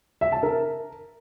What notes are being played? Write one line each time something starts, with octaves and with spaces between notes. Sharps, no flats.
E5
A5
A#4